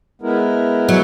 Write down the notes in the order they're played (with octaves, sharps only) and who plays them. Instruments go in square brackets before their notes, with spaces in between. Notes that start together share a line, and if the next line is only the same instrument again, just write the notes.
[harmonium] G#3 B3 E4 A#4
[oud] F#3